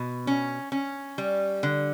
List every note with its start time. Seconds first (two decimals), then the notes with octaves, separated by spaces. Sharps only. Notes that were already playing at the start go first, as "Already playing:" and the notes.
Already playing: B2
0.27 C#4
0.72 C#4
1.18 G3
1.63 D3